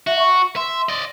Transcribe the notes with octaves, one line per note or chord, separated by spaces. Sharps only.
F#4 E5
C#6
E5 C6
D5 D#5